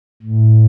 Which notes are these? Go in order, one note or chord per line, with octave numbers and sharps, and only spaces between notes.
A2